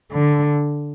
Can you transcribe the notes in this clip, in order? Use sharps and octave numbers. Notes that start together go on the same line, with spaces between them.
D3